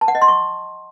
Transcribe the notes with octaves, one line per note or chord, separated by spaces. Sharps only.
A5
F#5
D#5
C6
C#6